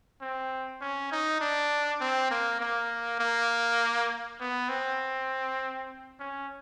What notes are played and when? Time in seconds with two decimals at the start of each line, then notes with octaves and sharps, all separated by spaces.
0.21 C4
0.81 C#4
1.11 D#4
1.41 D4
2.00 C4
2.31 A#3
2.61 A#3
3.19 A#3
4.40 B3
4.69 C4
6.19 C#4